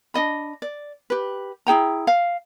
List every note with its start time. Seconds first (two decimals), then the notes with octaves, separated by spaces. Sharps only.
0.14 D4 D#4 D#5 B5
0.62 D5
1.10 G4 B4
1.67 E4 G#4 G5 A#5
2.07 F5